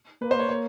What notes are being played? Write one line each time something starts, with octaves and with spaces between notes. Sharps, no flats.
A#3 B4
B3 C5
A#3 C#5
A#3 C#5